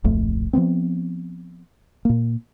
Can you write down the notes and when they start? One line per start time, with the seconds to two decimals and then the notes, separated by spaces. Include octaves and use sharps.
0.04 D1 A#1 F2 A3
0.53 F3 F#3 B3 C4
2.05 A#2 A#3